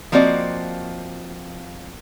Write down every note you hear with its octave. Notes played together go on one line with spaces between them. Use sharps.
F3 A#3 C4 F#4 D5 D#5